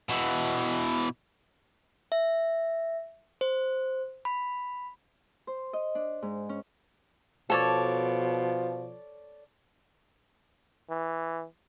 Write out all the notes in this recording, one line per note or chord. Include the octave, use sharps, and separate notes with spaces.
B2 E3
E5
C5
B5
C5
D#5
D4
G#2
C#4
B2 F3 A4 C#5 D5
E3